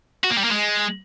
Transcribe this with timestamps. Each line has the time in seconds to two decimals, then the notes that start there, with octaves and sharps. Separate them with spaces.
0.24 F#4
0.31 A#3
0.38 G3
0.45 A#3
0.51 G#3